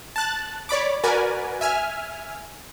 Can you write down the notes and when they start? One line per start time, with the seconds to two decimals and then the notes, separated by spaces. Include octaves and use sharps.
0.16 A5 F#6 A6
0.69 C#5 D5 B5 D6
1.04 F#4 A#4 B4 D5 G#5
1.61 E5 G#5 F6